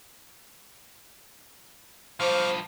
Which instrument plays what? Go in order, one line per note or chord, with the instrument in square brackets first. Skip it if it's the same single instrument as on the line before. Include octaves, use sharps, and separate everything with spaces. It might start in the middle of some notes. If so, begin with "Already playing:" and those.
[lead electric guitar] G2 F3 [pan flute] C5 [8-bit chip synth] F5 C#6 D6